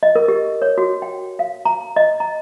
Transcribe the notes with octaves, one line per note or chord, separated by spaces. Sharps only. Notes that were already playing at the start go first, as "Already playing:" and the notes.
D#5
A#4
G4
C#5
F#4
G5
F5
A#5
D#5
A#5